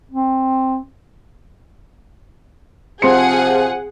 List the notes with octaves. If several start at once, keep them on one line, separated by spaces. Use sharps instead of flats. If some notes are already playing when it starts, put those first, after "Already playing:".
C4
C3 F3 C4 G#4 F#5 C6 C#7